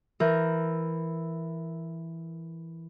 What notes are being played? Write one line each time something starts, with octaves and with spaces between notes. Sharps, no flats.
E3 A#4 G6